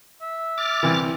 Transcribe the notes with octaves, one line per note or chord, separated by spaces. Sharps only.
E5
D6 F6 A6
C2 E3